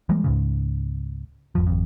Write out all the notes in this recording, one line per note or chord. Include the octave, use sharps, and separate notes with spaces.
E3 G3 G#3 A#3
C#2 G#2 C#3
G#1 F2 F3
G#1 F2